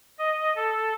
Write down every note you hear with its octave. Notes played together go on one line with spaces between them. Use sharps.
D#5
A4